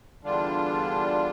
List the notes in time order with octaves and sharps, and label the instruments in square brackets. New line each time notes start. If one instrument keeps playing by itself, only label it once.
[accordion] E2 D3 G3 D4 F4